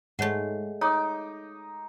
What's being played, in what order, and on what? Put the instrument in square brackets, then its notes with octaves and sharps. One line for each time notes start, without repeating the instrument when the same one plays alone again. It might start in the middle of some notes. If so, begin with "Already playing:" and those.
[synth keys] G#2 [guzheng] G#3 A3 [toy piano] C#5 F#5
[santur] D#4 D6 [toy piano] C#5 [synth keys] D#6